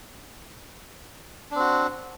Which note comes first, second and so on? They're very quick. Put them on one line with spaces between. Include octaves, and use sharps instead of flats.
D4 C4 F#4